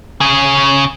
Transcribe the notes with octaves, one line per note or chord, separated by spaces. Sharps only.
C#3 G#4